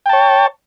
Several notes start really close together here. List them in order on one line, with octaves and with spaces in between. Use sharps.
G5 A5 C#5